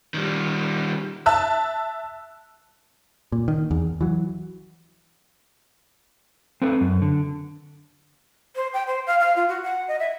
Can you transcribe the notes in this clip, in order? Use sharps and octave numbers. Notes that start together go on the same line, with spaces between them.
D#3 G3
E5 A5 E6 F#6
A#2
D#3
E2
E3 F#3
C4 A4 B4
F#2
D3
C5
G5
C5
F5
F5
F4
F#4
F#5
D#5
E5